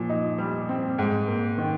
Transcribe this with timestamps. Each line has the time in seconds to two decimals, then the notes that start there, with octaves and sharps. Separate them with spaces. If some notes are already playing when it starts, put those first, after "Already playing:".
Already playing: A#2 F3
0.09 D#4
0.38 G3
0.69 C4
0.98 G#2
1.28 A#3
1.58 D#3